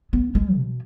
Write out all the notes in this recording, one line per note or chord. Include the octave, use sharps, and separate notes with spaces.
B3
G#3
B2